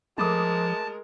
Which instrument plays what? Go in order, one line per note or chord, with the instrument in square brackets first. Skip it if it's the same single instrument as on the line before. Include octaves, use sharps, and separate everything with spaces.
[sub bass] F3 [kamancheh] G#3 A#4 [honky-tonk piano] A3 D6 D#6 [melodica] A5